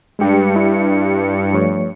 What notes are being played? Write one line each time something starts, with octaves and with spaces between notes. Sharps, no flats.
G2 G#3 G4 C#7
E4
F3 A3 C#5